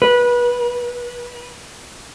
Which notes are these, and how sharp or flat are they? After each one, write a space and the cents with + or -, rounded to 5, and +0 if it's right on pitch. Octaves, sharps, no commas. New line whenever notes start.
B4 -25